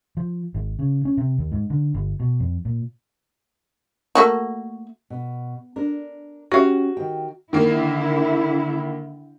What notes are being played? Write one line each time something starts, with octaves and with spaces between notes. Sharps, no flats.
F3
G#1
C#3
C#4
C3
D#2
G#2
D3
G1
B2
F2
A#2
A3 A#3 F#4
B2
D4 A#4
C#4 F#4 G4 F5
D#3 G5
D3 D#3 A#3 E4